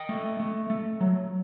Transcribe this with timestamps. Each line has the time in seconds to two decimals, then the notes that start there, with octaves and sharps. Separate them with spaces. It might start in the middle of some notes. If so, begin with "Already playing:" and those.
Already playing: D#5 G5
0.09 A3
0.40 A3
0.70 A3
1.01 F#3